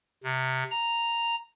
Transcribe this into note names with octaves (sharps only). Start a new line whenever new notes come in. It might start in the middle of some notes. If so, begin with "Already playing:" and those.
C3
A#5